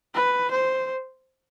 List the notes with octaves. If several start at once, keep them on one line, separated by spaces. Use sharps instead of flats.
B4
C5